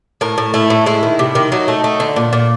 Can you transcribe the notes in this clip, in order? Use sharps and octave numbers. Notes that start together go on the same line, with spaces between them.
A2 A#4
A2
A3 E4
A2
G#3 E4
D#3
C3
D#3
F#3 D#4
A3
A3
D3
A#2
A#2